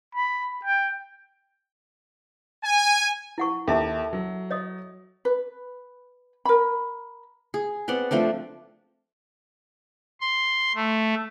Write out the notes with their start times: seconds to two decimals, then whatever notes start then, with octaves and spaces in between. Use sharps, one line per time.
0.15 B5
0.65 G5
2.65 G#5
3.38 E4 F#5 C#6
3.68 D#2 A4 E5 A5
4.13 F#3
4.51 C#5 D#5 D#6
5.25 B4
6.45 A#4 B5
7.54 G#4
7.88 B3 C4 D5 F#5
8.11 F3 A3 C4 D4
10.21 C6
10.75 A3